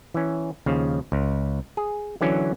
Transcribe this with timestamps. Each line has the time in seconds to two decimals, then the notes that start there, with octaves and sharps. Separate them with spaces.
0.14 E3 C#4
0.66 D#2 C#3 F3
1.12 C#2
1.77 G#4
2.21 D3 E3 F#3 C#4